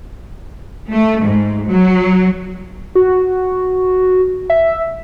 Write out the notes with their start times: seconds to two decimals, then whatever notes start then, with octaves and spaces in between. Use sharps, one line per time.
0.91 A3
1.24 G#2
1.68 F#3
2.95 F#4
4.50 E5